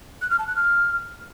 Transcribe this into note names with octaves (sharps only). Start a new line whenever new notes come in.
F#6
F6
A5
F#6
F6